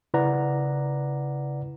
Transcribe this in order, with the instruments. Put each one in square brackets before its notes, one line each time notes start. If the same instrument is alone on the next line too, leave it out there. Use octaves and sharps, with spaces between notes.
[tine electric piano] C#3 E4 B4 D5 F#5 A#5